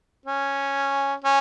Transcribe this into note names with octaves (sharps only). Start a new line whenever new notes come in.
C#4
C#4